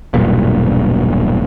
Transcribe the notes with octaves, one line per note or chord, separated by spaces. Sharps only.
E1 B1 G2 A#2